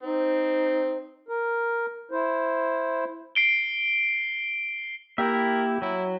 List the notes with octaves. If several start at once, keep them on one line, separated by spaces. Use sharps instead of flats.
C4 D#4 C5
A#4
E4 C5
C7 D7 G7
A#3 E4 G4 A#4 E5 G5
F#3 E4